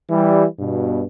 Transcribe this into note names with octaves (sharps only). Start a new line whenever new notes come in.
E3 G3
G2 B2